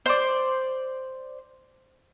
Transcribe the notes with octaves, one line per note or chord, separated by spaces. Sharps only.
C5 D5